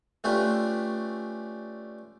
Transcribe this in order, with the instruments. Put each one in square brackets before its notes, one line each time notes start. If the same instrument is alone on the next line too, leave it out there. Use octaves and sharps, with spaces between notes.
[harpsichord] A3 C#4 D4 F4 G4 B4